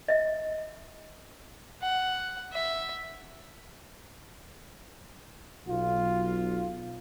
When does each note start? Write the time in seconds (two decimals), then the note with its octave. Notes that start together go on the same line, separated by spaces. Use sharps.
0.08 D#5 E5
1.82 F#5
2.53 E5
5.68 B1 F4